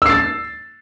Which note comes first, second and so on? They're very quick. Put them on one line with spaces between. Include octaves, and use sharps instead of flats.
E6 C7 A6